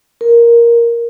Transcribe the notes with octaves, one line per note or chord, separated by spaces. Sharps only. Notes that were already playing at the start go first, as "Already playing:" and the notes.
A#4